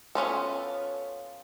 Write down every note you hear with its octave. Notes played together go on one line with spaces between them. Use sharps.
B3 C#4 F4 A4